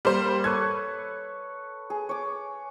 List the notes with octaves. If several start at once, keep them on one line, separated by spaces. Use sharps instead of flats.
G3 A#3 C5
A4 B4 C#5 G#6
G#4
C#5 D6